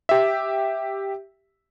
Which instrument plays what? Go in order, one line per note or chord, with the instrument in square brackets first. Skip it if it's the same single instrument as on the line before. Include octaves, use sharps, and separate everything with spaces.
[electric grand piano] G4 E5